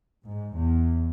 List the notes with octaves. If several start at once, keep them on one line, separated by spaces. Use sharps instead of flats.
G#2
E2